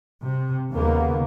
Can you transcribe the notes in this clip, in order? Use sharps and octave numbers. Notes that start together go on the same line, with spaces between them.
C3
D#2 C#3 A#3 B3